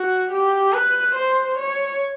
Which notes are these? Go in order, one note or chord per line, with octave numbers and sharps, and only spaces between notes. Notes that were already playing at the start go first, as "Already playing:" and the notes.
Already playing: F#4
G4
B4
C5
C#5